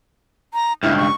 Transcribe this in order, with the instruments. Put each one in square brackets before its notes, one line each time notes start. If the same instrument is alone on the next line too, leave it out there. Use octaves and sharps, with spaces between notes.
[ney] A#5
[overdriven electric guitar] C#2 G2 [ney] E4
[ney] C#6